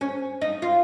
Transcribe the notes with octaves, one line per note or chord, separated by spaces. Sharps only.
C#4
D#4
F4